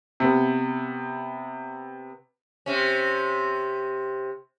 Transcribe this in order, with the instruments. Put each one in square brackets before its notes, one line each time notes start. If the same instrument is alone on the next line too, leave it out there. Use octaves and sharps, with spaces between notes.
[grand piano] C3 B3
[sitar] C3 C#4